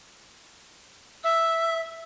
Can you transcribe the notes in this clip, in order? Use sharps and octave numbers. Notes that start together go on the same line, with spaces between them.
E5 E6